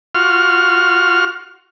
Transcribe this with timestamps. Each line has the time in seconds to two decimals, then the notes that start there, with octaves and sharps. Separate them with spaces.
0.15 F4 F#4 F6